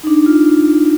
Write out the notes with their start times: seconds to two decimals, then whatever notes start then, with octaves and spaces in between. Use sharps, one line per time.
0.03 D#4
0.07 D4
0.26 F4